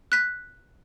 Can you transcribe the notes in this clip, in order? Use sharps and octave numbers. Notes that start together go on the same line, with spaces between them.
F#6 B6